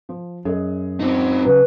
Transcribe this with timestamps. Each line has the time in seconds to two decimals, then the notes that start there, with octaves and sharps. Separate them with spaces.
0.09 F3
0.45 F#2 G#4 D#5
1.00 C4 D#4
1.45 C#3 F#3 B4